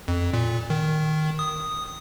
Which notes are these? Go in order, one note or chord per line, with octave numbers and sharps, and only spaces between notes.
F2
A#2
D#3
D#6